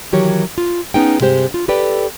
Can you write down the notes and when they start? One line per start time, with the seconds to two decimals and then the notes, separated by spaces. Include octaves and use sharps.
0.12 D#3 E3 F#3 G4 A#4 C#5
0.58 F4
0.94 B3 C#4 D#4 G#4 G5
1.20 G2 C3 G#3 G4 C5
1.54 F4
1.68 G4 A4 B4 D5 G5